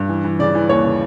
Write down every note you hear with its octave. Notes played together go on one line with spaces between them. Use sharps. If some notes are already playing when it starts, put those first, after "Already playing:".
Already playing: G2
E3
E3
C#3 D5
E3
D#2 C#5
C#3